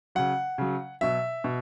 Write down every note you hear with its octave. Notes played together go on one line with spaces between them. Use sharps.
C#3 F#3 F#5
C#3 F#3
B2 F#3 E5
B2